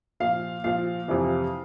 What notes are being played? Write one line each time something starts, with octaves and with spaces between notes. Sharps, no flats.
A#2 F3 F5
A#2 F3 F5
F2 C3 E3